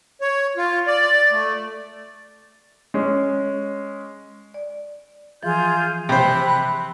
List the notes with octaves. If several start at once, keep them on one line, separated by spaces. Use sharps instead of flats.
C#5
F4
D5
A3
G#3 C#4
D5
E3 F3 F4 G#4 G6
C3 C5 B5 F#6